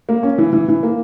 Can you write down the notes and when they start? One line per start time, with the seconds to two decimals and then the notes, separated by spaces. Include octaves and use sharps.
0.09 A#3
0.23 C#4
0.38 E3
0.53 E3
0.68 E3
0.83 A#3